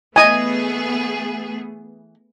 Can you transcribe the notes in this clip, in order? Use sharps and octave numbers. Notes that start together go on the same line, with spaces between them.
E3 A3 B3 G#4 D#5 G#5